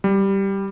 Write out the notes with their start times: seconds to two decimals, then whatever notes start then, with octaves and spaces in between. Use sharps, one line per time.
0.04 G3